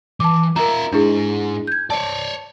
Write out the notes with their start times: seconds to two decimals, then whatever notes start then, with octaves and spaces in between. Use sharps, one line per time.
0.20 E3 A5 D6
0.56 F4 A#4 E5 A#5
0.92 G#2 D4 E4 G#4
1.67 G6 G#6
1.90 C#5 D5 A5